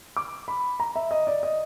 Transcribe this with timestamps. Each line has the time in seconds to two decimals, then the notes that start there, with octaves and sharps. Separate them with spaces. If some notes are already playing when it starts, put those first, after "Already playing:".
0.17 D6
0.48 B5
0.80 A#5
0.96 E5
1.11 D#5
1.27 D5
1.43 D#5